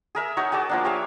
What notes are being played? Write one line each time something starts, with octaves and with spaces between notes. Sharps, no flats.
G#4 A#4 E5
D#4 F#4 C#5
F#4 G#4 A5 D6
F3 A#3 D4
G4 C#5 E5 F5